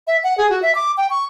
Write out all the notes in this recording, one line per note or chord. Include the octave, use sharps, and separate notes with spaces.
E5
F#5
G#4
F#4
E5
D6
G5
C#6